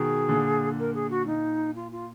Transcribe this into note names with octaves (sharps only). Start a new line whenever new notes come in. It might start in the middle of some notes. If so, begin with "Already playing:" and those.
Already playing: B2 D#3 G#4
A#2 D3
A#4
G#4
F#4
A#2 D#4
F4
F4